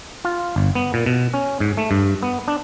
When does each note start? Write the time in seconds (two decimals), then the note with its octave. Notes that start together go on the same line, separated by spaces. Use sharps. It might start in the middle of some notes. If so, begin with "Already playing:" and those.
0.25 F4
0.56 G1
0.75 B3
0.94 A#2
1.06 B2
1.34 C#4
1.60 G#2
1.77 A3
1.91 G2
2.23 B3
2.48 D4